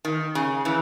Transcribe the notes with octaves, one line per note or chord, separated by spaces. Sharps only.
D#3
C#3
C#3 E3